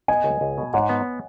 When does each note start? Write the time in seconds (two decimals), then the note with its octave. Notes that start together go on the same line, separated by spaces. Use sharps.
0.08 B3 D#5 G#5
0.24 C#2
0.41 C#2
0.58 B2
0.73 G#2 C#5 F#5
0.89 B3